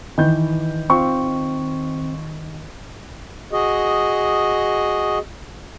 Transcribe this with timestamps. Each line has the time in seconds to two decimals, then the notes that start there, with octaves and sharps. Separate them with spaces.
0.18 D#3 E3 B4 G6
0.90 C4 F4 C#6
3.52 F#4 G#4 D#5